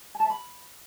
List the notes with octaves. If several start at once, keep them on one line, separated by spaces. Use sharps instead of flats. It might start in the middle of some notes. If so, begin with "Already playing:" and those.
G#5
A5
E5
B5